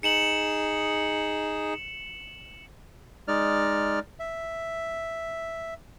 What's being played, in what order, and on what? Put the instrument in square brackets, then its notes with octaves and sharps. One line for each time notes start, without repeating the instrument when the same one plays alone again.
[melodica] D#4 G#4 [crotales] C#7 E7 F#7
[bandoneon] G#3 D#4 D5 F6
E5